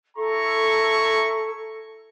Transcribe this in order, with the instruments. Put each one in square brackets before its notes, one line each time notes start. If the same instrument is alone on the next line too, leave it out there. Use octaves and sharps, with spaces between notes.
[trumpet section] E4 A#5 C#6 [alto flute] A4